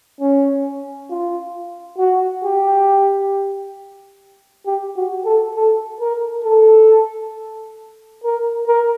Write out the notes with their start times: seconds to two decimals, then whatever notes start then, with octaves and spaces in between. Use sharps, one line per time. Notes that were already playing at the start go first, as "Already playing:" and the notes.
0.21 C#4
1.10 F4
1.98 F#4
2.44 G4
4.66 G4
4.97 F#4
5.26 A4
5.55 A4
6.00 A#4
6.44 A4
8.24 A#4
8.67 A#4